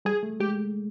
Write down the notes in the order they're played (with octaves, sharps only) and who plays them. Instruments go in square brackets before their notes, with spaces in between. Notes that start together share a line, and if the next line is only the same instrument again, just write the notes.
[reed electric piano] G3 [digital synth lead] G#4
[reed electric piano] A3
[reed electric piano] G#3 [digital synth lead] G4